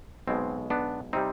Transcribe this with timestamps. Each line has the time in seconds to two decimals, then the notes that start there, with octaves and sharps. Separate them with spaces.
0.28 B1 B2 G#3 C4
0.70 B3 D4
1.13 C3 G3 C4 D#4